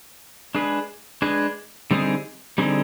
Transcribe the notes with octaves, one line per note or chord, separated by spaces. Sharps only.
G#3 D4 G#4 B4
G#3 D4 G#4 B4
D3 G3 C4 D#4 G#4
D3 G3 C4 D#4 G#4